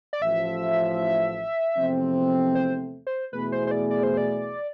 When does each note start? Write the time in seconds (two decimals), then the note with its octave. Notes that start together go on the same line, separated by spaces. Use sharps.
0.13 D5
0.22 A1 A2 F3 E5
1.77 E2 C3 F3 A3 C4
2.55 C5
3.07 C5
3.33 E2 B2 A3 E4 G#4 B4
3.52 C5
3.67 C5
3.71 D5
3.91 D5
4.03 C5
4.17 D5